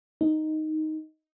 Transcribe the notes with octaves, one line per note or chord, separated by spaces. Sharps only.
D#4